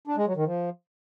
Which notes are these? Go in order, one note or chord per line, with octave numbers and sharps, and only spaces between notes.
D4
G#3
F#3
D#3
F3